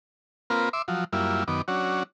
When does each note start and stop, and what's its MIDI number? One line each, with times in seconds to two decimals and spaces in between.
0.50 0.69 58
0.50 0.69 60
0.50 0.69 65
0.50 0.69 70
0.50 0.69 71
0.73 0.82 76
0.73 0.82 84
0.73 0.82 86
0.88 1.04 53
0.88 1.04 54
1.13 1.44 42
1.13 1.44 55
1.13 1.44 58
1.13 1.44 64
1.13 1.44 65
1.48 1.62 42
1.48 1.62 51
1.48 1.62 59
1.48 1.62 86
1.68 2.03 54
1.68 2.03 61
1.68 2.03 62
1.68 2.03 66